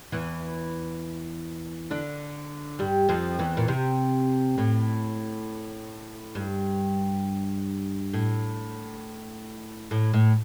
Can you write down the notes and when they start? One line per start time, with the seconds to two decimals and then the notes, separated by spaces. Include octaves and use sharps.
0.12 E2 E3
1.91 D3 D4
2.79 G2 G3
3.09 F2 F3
3.39 E2 E3
3.57 A#2
3.68 C3
4.58 A2
6.35 G2
8.13 A2
9.91 A2
10.14 A2